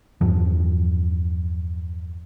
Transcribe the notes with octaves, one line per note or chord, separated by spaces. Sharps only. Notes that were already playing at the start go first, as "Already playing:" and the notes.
E2 G2 F3